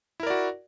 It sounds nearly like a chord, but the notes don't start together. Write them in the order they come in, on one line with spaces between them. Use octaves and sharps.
E4 A#4 D5 F#4